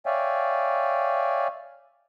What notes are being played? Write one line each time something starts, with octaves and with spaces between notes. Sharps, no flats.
C#5 D5 E5 F5 G5 G#5